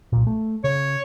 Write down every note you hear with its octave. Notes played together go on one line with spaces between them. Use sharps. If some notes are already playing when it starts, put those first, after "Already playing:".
B1 A#2
A3
C#3 C#5